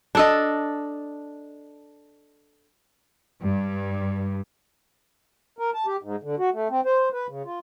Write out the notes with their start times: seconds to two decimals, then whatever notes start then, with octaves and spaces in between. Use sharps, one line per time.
0.15 D4 A4 D#5
3.42 G2
5.59 A#4
5.74 A5
5.86 G4
6.03 G#2
6.23 D3
6.39 F#4
6.53 A3
6.70 C4
6.85 C5
7.13 B4
7.29 C#3
7.45 F4